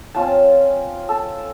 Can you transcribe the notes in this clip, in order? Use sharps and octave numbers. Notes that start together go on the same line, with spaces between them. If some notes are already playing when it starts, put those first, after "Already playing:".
C4 C#4 F4 A5
A4